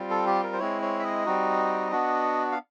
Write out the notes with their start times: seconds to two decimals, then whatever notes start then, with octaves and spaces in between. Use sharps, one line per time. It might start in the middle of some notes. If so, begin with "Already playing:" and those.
Already playing: G3 C4 F4
0.10 A4
0.27 G4
0.43 A#4
0.53 C5
0.59 G#3 C4 E4 C#5
0.82 C#5
0.99 E5
1.04 D#5
1.26 G3 C4 D#4 F#4
1.92 B3 D4 F#4
2.52 F5